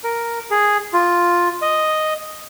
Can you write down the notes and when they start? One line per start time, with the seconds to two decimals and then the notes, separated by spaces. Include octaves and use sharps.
0.04 A#4
0.51 G#4
0.93 F4
1.62 D#5